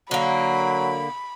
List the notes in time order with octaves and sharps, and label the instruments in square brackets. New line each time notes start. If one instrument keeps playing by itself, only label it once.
[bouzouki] D3 A#3 [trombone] F#3 [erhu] B5